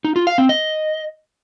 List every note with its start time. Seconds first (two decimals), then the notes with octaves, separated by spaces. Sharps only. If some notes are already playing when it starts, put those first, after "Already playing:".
0.04 D#4
0.16 F4
0.27 F5
0.38 C4
0.49 D#5